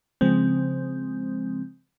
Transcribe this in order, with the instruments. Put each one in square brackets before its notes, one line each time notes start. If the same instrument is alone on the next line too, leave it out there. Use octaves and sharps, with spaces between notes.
[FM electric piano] C#3 F3 G#3 C4